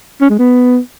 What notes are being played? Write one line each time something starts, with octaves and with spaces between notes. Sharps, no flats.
C#4
G#3
B3